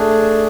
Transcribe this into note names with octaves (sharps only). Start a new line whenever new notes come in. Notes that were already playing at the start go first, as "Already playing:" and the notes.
Already playing: A3 D4 G#4